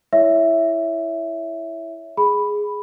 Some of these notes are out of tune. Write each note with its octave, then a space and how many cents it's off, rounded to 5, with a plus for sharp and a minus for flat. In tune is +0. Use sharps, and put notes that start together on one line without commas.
E4 +0 C#5 +15 E5 +0
G#4 +0 B5 +0